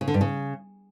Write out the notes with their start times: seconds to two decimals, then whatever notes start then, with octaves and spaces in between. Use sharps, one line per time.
0.01 C#3
0.08 D3
0.14 G2
0.21 C#3